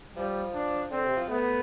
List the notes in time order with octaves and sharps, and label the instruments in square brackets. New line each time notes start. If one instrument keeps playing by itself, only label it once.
[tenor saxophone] F3 [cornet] G3
[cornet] D4
[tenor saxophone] D3 [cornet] C4
[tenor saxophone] C3
F3
[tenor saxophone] A3 [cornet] B3